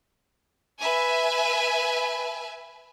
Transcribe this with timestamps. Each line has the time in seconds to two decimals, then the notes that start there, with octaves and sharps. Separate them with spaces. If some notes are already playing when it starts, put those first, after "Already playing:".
0.80 B4 E5 G#5